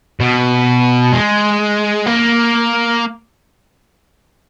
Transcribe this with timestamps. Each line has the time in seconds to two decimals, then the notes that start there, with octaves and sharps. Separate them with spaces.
0.20 B2
1.13 G#3
2.07 A#3